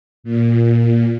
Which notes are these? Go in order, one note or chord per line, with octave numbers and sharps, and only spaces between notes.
A#2